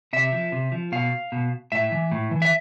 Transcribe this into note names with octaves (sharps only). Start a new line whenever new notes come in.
C3 E5
F3
C3
F3
B2 F5
B2
A2 E5
E3
A2
E3
E5